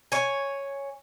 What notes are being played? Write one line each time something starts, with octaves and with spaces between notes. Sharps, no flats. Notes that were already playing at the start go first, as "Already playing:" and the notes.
C#5 G#5